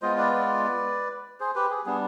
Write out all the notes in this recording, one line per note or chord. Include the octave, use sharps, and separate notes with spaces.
G#3 B3 F4 C5 D#5
B4 D5
B4 D5
G#4 C5
G4 B4
G#4
G3 B3 D4 G#4